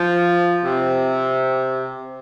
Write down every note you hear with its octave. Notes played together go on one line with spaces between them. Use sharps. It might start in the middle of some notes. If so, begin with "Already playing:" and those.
Already playing: F3
C3